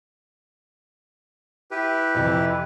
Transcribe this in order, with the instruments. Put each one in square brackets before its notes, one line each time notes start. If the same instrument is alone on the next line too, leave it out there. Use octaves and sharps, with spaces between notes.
[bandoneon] E4 G4 B4
[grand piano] F2 C3 E3